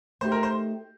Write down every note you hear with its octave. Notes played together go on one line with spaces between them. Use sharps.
A3 D#4 G4 C5
A#4
C5